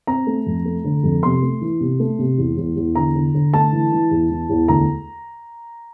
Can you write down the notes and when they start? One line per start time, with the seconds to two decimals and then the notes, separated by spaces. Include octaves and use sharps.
0.07 C4 A#5
0.27 A3
0.46 F2
0.65 A3
0.84 D3
1.03 F2
1.23 C3 C6
1.42 A3
1.61 E3
1.80 C3
2.00 A3
2.19 C3
2.38 E2
2.57 E2
2.76 E2
2.95 D3 A#5
3.15 D3
3.34 D3
3.53 A3 A5
3.72 E3
3.92 E3
4.11 E2
4.30 E3
4.49 E2
4.68 D2 A#5